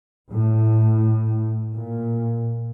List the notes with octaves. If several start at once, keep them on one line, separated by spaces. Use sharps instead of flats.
A2
A#2